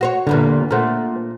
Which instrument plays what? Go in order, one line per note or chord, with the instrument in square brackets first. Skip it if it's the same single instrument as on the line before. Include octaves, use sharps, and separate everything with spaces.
[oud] F#4 C5 C#5
[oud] E2 G2 A#2 [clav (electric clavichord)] D3 B4
[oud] A#2 A3 [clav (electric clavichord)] A#4 C5 F#5